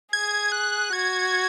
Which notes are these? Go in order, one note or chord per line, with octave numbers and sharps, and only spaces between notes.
G#4 G#6
F#6
F#4 G#6